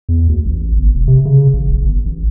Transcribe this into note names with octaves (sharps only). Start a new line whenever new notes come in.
E2
D2
A1
G1
E1
C3
C#3
A1
D1
G1
A1